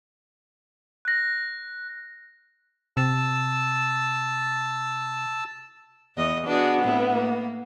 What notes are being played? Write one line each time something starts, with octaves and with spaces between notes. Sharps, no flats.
F#6 A#6
C3 A5 E6
E2 D#5
B3 D4 F#4 G#4
A2 C4 E4
A#3